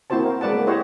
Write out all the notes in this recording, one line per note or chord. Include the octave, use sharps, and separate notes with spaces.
A#3 C4 E4 F#4 C5 A5
A#4
G#3 B4 D5 F#5 A5
A#3
E4 G4 C5 C#5 D#5 F#5